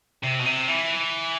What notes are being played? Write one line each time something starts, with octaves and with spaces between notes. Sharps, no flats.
C3
B2
C3
E3